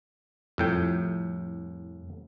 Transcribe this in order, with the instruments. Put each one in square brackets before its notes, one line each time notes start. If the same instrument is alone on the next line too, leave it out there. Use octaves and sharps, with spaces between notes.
[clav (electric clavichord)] C2 A2 G5 [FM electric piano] F2